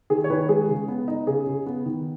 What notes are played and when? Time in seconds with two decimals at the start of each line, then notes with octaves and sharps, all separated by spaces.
0.10 D#3 G#4
0.24 C#5
0.30 D#3 B4
0.49 G#3 G#4
0.68 C#3
0.88 B3
1.08 D#4
1.27 C#3 G#4
1.47 C#3
1.66 B3
1.86 D#3